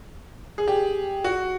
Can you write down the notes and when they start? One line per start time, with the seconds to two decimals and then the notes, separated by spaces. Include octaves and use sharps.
0.58 G#4
0.68 G4
1.24 F#4